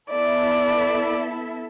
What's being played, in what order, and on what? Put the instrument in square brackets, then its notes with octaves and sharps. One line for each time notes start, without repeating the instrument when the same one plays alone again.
[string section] B3 E4 A4 E5 [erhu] D5